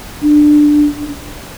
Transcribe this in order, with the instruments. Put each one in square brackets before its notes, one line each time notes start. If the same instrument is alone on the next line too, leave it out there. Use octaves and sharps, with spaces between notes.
[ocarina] D4